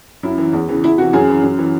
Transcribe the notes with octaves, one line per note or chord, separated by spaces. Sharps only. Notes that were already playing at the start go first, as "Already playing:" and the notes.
F#2 E4
E3
E2
C#3 E3
E2 E4
C3 E3 F#4
F#2 G#4
E3
F#2
E3